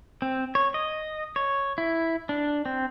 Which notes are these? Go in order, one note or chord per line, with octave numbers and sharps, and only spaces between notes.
C4
C#5
D#5
C#5
E4
D4
C4